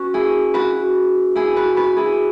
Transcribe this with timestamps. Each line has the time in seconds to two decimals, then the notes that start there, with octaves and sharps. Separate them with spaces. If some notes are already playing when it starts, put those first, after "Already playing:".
Already playing: C#4 F#4 B4
0.14 E4 G#4
0.54 F#4 B4
1.36 E4 G#4
1.56 F#4 B4
1.76 F#4 B4
1.96 E4 G#4